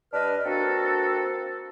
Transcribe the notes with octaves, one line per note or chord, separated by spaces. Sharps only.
G2 D4 B4 D#5 F6
A#3 C4 D4 F#4 A4